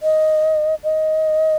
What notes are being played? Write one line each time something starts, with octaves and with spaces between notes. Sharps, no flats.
D#5
D#5